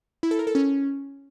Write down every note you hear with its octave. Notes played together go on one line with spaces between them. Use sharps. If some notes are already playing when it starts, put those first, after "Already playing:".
E4
A4
A#4
A4
C#4